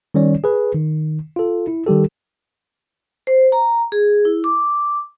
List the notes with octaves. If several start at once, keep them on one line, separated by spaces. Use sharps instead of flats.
D#3 G3 C#4 C#5 D5
G#4 B4
D#3
F4 A4
E4
D#3 G3 G4 A4
C5
A#5
G#4
E4
D6